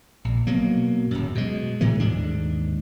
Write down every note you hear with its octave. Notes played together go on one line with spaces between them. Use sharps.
A#1
B2 F#3 A#3
D1 F#2
B2 G#3
A2 E3 G#3 A3
D#2 G#2 D4